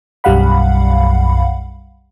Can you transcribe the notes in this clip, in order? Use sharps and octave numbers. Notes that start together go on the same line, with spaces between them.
B1 F#2 G3 F5 F#5 B5